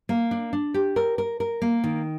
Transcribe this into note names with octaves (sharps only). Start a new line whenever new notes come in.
A#3
D4
D4
G4
A#4
A#4
A#4
A#3
D#3